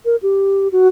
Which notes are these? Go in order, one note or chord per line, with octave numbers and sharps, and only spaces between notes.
A#4
G4
F#4